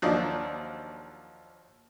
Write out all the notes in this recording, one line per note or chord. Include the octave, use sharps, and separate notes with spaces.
D#2 F3 F#3 D4 D#5